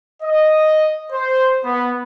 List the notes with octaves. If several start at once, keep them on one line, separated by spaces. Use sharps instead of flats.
D#5
C5
B3